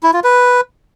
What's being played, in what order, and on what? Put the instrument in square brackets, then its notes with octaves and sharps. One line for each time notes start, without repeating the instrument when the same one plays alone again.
[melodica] E4
F4
B4